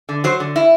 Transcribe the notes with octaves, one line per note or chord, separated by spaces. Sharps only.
D3
F#3 C5
D3
E4